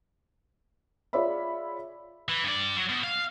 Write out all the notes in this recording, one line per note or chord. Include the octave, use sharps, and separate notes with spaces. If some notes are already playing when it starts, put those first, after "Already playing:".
F4 G#4 C#5 D5 E5 B5
E3
G2 D5
F#3
B2
F5